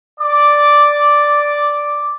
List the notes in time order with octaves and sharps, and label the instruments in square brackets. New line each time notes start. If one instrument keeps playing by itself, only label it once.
[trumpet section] D5 D6